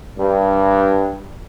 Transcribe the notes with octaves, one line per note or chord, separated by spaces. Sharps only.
G2